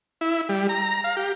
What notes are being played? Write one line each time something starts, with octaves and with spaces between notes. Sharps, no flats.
E4
G3
A#5
F5
G4